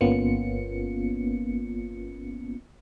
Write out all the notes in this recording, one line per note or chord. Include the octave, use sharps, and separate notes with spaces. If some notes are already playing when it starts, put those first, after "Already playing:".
G1 A#3 B3 C#4 F4 C#7